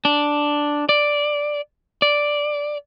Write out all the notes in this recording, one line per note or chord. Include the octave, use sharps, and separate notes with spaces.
D4
D5
D5